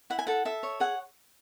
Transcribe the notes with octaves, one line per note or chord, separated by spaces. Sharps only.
E4 F#5
G#5
A4 F#5
A4 E5
C#5
G#4 F#5